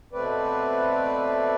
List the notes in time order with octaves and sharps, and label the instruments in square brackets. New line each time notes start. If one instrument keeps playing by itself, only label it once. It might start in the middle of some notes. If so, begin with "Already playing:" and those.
[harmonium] B2 A3 C4 B4 D5